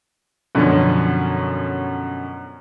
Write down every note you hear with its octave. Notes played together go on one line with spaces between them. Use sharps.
F#2 B2 D3 F3 C#4